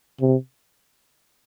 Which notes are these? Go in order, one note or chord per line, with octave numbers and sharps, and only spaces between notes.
C3